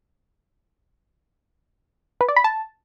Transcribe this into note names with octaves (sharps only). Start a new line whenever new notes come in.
B4
D5
B5
A5